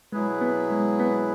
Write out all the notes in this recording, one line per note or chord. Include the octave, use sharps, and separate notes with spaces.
B2 F#3 G#3 E4 G#4 B4
B3
G#3
B3